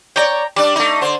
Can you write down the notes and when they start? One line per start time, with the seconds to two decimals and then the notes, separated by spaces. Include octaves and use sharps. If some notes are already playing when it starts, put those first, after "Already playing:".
0.16 C#5 D5 G5 A#5
0.56 G3 D4 D5
0.76 A3 D#4
1.01 D3 C5